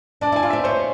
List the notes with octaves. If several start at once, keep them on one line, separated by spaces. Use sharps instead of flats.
D4 D5
E4
G#5
F4
C4 E5
C#4 C5